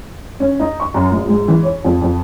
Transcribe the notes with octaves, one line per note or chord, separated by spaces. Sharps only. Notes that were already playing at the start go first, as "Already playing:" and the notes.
C#4
D#4
C#6
F#2
A#1
G#2
E3
C#5
F2
F2